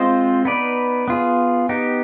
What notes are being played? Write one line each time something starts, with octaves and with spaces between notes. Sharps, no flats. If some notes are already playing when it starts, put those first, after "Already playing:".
Already playing: G#3 C4 F4 C5 D#5
B3 D#4 B4 D5
B3 F4 G#4
B3 D#4 G4